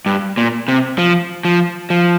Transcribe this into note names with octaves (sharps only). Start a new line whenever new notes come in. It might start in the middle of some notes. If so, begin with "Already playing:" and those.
G2
A#2
C3
F3
F3
F3